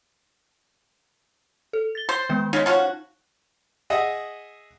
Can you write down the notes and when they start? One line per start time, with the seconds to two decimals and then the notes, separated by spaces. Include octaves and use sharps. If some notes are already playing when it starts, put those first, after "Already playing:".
1.73 A4
1.95 A6 G7
2.09 C5
2.29 D#3 G#3 B3
2.53 C#3 G#3 D#4
2.66 F3 C#4 F#4
3.90 G#4 D#5 E5 F#5